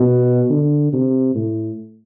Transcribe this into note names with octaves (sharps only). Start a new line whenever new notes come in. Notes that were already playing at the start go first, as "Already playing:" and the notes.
Already playing: B2
D3
C3
A2